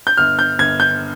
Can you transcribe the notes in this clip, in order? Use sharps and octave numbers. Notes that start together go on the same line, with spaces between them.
G6
G1 F6
G6
G1 G#6
G6